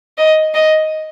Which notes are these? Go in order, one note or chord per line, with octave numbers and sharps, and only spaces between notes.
D#5
D#5